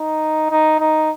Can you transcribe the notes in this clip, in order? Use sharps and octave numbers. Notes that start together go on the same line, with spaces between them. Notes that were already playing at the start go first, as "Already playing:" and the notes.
Already playing: D#4
D#4
D#4